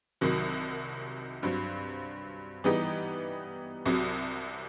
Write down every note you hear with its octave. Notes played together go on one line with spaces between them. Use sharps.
C2 C3 D#3 F#3
G2 F#3 C4
E3 G3 B3 D#4 G4
C2 C3 F#3